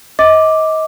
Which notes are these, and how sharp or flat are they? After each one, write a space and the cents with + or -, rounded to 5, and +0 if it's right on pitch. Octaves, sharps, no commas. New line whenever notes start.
D#5 +30 D6 +0